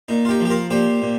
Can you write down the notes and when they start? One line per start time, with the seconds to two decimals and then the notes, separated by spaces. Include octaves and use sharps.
0.08 A#2 D#4
0.25 F4
0.29 D#4 G4
0.40 F3 G4
0.50 F4 A#4
0.70 A#2 G4 C5
1.02 A#2